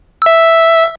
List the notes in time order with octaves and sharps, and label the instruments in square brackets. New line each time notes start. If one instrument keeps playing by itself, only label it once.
[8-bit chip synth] E5 E6